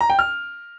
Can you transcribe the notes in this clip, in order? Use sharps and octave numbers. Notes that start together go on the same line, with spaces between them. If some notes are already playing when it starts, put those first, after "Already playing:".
A#5
G5
F6